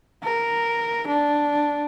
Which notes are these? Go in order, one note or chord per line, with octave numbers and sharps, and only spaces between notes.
A#4
D4